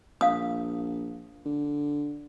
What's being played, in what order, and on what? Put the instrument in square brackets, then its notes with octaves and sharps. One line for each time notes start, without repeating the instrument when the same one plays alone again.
[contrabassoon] A#1 [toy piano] F5 D#6
[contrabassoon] D3